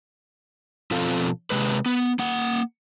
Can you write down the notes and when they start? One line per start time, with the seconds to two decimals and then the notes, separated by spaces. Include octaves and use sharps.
0.91 B2 F3 C4 F4 A4 F5
1.50 C3 G#3 B4
1.86 B3
2.19 A#3 F#5